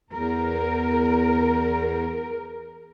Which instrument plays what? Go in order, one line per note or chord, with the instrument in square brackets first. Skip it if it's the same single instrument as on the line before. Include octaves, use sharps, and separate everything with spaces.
[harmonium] E2 [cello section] A#4